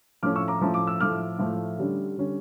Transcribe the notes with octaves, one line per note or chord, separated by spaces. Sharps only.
A2 F3 A3 C#4 D6 F6
C#6 E6
A#5 D6
A2 F3 A3 C#4
D6
E6
A2 F3 A3 D6 F6
A2 F3 A3
D3 G3 C#4
D3 G3 C#4